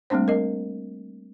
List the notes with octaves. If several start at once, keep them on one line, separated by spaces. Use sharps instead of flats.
G3 A3 A#3 C4 D4 C5
A#4 D#5